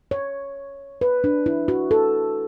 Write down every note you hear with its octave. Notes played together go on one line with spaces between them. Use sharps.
C#5
B4
D4
E4
F#4
A4